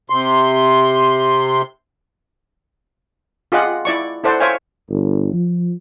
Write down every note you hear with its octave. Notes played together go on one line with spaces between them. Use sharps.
C3 C6
F4 G4 G#4 D#5 F#5
E4 D5 C#6
E4 A4 C5 D5 F#5
C5 C#5 E5 F5 G5 G#5
G1
F3